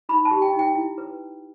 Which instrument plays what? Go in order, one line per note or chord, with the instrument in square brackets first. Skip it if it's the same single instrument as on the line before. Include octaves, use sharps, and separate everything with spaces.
[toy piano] D#4 B5
A5
G4
G5
D#4
G5
E4
B4